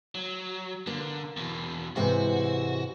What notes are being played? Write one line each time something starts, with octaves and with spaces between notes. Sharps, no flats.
F#3
D3 A#3
E2 B2
G#2 C3 E3 F#4